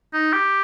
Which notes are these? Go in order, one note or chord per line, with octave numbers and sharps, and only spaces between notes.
D#4
G4